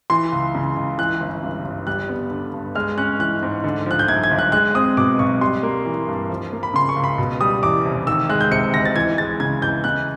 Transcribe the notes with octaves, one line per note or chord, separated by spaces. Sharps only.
E3 C6
C#2
C#3
C#2
E3 F#6
G1
G2
G1
G3 F#6
B3
D3
G2
G#3 F6
C#4 F#6
E3 F#6
G#2
D3
F3 F#6
G6
F#2 G#6
G#6
G1
F#6
G#3 F#6
C4 D#6
B2 D6
B1 C#6
G3 C6
A#3
E3
G2
F3
A#3
B5
C#3 C6
C#6
C#2
B5
B2
G3 D#6
E2 D6
F1
D#3 E6
G#3 F#6
G6
C3 C#7
D2 A#6
A6
E3 G#6
G#3 A6
C#3 G#6
E2 G6
C#3 F#6